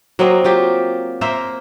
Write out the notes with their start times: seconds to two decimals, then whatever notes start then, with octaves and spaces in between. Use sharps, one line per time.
0.19 F#3 A#3 C4 D#5
0.44 F#3 F4 G4
1.21 A#3 A#4 C5 E5